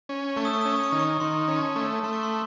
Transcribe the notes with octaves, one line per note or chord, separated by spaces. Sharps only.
C#4
A3 C#6
D#6
C#6
D#6
C#4 C#6
D#6
C#6
D#3 D#6
C#6
D#3 C6
C#4
A5
A3
A3 C6
C#6
C6